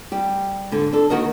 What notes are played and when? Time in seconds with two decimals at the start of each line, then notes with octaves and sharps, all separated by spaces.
0.12 G3 G4
0.72 G#2 D3
0.92 D4 A4
1.10 D#2 D#3 F#4 A#4 D#5